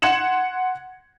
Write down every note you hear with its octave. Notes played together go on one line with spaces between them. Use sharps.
F#5 C6 G#6 C#7 E7 F#7